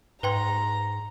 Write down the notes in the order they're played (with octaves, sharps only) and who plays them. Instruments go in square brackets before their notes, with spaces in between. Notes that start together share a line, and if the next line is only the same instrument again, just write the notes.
[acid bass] G#2 [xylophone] B4 G5 C6 [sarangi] A#5